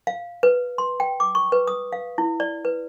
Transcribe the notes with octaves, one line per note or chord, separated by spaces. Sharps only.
F5
B4
C6
G5
D6
C#6
B4
D#6
F5
E4
D5
B4